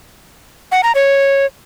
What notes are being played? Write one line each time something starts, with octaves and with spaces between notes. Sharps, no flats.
F#5
A#5
C#5